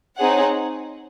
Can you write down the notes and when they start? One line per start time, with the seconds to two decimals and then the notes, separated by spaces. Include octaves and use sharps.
0.18 C4 D#4 G#4 C#5 F#5